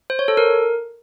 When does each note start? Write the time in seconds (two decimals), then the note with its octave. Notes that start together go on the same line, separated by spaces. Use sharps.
0.10 C5
0.19 C#5
0.28 A4
0.37 A#4